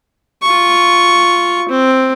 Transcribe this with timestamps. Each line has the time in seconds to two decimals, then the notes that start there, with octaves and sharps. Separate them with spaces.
0.42 F4 C#6
1.69 C4